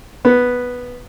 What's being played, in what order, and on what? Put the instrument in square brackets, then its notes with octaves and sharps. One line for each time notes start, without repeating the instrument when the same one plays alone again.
[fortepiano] B3